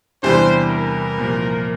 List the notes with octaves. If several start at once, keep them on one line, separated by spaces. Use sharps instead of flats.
E2 C3 E3 G3 D4 C5
A#4
C2 A#2 F3